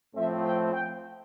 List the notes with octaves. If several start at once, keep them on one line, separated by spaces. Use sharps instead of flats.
A2 F3 A3 C4 E5
G5
G5